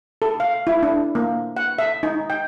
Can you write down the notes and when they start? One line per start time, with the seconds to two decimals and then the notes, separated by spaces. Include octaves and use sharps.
0.22 A4
0.40 F5
0.67 E4
0.83 D4
1.15 A#3
1.57 F#5
1.79 E5
2.03 D#4
2.30 G5